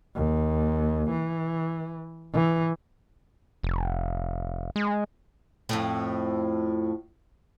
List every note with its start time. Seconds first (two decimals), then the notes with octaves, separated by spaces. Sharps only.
0.16 D#2
1.10 E3
2.34 E3
3.63 F1
4.76 G#3
5.69 F2 A2